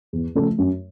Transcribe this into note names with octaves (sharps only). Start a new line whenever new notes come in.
E2
C#3 F3 A3
F#2